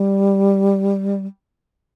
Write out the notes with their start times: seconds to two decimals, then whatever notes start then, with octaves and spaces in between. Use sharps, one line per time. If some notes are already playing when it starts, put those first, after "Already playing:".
Already playing: G3